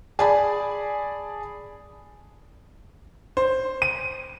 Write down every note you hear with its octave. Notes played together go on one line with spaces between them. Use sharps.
G#4 D5 G#5 A5 B5
C5
D#7